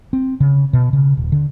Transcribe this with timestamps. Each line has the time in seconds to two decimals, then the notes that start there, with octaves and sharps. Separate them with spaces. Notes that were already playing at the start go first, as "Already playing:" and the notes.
0.13 C4
0.40 C#3
0.73 B2
0.93 C#3
1.17 D#1
1.32 D3